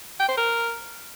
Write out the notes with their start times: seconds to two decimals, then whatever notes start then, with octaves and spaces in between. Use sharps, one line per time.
0.20 G5
0.29 C5
0.37 A#4